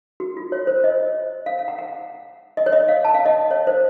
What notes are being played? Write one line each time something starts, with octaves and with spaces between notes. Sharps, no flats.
F#4
F4
C#5
C5
D#5
F5
F5
F#5
F#5
D#5
C#5
D#5
F5
A5
F5
D#5
C#5
C5